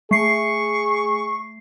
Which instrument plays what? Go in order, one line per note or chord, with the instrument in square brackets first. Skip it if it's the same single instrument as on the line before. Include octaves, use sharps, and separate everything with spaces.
[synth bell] A3 C7 [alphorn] G#4 [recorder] C#6